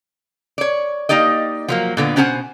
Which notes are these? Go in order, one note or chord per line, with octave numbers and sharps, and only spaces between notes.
C#5 D5
A#3 D#4 G4 D5 D#5
F3 F#3 A#3
A#2 D3 B3
B2 C#4 D4 C5 F#5 G#5